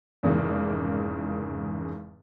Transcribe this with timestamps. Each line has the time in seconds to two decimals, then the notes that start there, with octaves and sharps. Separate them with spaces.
0.23 F1 E2 G#2 C#3 E3 A#3